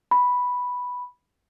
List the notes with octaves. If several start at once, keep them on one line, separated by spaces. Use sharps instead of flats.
B5